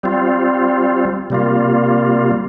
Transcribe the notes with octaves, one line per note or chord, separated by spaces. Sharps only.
G3 C4 F4
C3 G3 A#3 F4